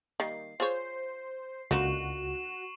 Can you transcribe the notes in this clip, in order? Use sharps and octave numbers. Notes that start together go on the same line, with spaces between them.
D#3 G3 A#3 C7
F4 G#4 C5 C#5
C#2 D3 A#3 D#4 F#4 C#6 E7 F#7